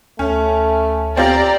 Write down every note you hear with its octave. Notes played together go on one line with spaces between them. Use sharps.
D2 A3 C#4
C4 F4 G4 D5 A#5